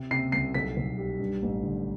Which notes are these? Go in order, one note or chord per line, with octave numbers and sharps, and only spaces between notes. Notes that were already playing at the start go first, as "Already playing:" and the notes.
Already playing: C3
C3 C7
C2 C7
B1 B6
B1
G3
G2
A1
D3